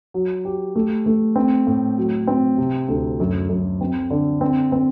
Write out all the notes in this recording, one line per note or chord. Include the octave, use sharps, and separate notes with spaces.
F#3
G4
A3
A3
C4
A2
F#3
C4
C3
D2
F#2
F#2
C4
D3
C4
C4